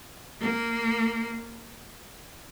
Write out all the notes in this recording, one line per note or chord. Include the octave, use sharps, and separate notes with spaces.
A#3